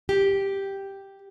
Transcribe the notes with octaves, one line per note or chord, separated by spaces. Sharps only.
G4